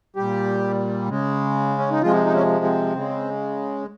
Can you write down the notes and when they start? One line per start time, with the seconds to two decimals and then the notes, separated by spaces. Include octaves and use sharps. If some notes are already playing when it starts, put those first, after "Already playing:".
0.16 A#2 G3 G4
1.09 C#3 G#3
1.78 C#4
1.90 D#4
2.02 C3 F3 G#3 F4
2.26 D#4
2.34 C#4
2.65 C4
2.95 C#3 G#3